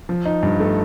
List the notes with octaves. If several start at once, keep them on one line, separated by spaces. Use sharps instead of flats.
F3
D#4
G2
A3